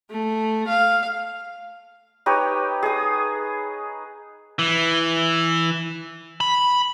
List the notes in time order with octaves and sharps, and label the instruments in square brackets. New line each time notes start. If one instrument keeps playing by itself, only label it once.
[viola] A3
F5
[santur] D#4 G4 B4 C#5
G#4 D#6
[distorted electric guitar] E3
B5